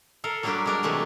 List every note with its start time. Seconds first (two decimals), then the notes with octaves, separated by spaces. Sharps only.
0.24 A4 A#4 F5
0.43 F#3 G3 A#3 D4 F#4 G4
0.66 G#3 D4 A#4
0.83 C3 E3 G#3 A3 A5